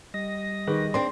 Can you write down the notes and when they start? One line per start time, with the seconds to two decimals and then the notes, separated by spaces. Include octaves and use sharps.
0.14 G3 D#5 A#6
0.67 D#3 G#4 B4
0.94 C4 D4 C6